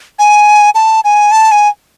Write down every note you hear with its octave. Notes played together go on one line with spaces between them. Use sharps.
G#5
A5
G#5
A5
G#5